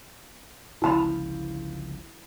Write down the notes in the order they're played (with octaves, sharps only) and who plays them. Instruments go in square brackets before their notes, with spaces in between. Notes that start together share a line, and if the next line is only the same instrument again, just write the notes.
[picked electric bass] G1 C#2 F3 [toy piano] E4 A#5 B5